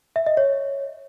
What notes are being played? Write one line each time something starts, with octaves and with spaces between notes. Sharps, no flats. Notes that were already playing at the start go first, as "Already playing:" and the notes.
E5
D#5
C#5